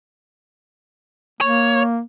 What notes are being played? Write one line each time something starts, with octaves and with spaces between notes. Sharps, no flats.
A#3 C#5